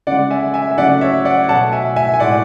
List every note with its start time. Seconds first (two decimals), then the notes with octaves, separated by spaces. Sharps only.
0.07 C#3 G#3 D5 F#5
0.30 E5 G#5
0.54 E5 G#5
0.71 E5
0.78 C#3 F#3 A3 D5 F#5
1.01 C#5 E5
1.25 D5 F#5
1.49 B2 F#3 A3 F#5 A5
1.72 E5 G#5
1.96 E5 G#5
2.14 G#5
2.20 A2 G#3 D5 F#5